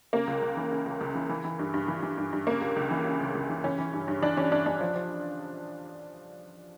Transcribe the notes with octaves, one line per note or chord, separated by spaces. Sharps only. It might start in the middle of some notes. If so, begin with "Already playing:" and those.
C#3 A#3
C#2
C#2
E3
C#3
C#2
C#2
E3
E3
E3
G2
G2
E3
E3
G2
G2
C#3 A#3
C#2
C#2
E3
C#3
C#2
C#2
E3
E3 C#4
E3
G2
G2
E3 D4
E3 C#4
G2 D4
G2 D4
F3
F3